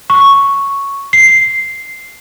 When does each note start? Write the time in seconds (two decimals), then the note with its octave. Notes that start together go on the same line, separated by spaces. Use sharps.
0.10 C#6
1.13 C7